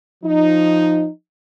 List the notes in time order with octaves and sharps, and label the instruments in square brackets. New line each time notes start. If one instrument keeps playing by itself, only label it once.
[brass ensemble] F3 D#4